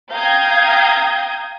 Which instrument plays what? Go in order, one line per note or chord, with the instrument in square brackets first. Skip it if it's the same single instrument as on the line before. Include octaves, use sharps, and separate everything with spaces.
[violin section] F5 G5 A#5 D#6 G6 G#6